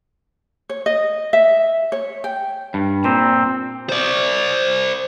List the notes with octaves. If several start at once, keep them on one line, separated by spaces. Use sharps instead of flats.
C#5
D#5
E5
C#5
G5
G2
A#2 C4
C5 D5